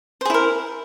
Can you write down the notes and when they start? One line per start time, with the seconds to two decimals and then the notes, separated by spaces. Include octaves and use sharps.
0.21 C5
0.25 G#4
0.30 E4
0.34 A#4